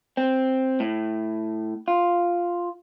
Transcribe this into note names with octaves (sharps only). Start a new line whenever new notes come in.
C4
A2
F4